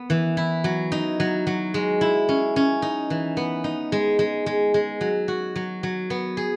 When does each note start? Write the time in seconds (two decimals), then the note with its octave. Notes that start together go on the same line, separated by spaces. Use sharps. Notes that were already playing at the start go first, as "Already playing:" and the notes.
Already playing: B3
0.10 E3
0.37 E4
0.64 F#3
0.92 D#4
1.20 F#3
1.47 F#3
1.74 G#3
2.01 E4
2.29 C#4
2.56 C#4
2.82 D#4
3.10 E3
3.37 B3
3.64 D#4
3.92 G#3
4.19 G#3
4.46 G#3
4.74 G#3
5.01 F#3
5.28 F#4
5.56 F#3
5.83 F#3
6.10 B3
6.37 G#4